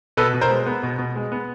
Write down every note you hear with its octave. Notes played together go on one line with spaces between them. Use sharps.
B2 A4 B4
B2
A#4 C5
G#3
B3
B2
B2
G#3
B3